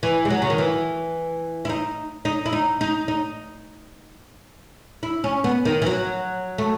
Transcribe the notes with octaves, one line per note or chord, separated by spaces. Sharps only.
E3
G#3
F#3
C#3
D#3
E3
E4
D#4
D#4
E4
D#4
D#4
D#4
E4
C#4
B3
D#3
E3
F#3
A3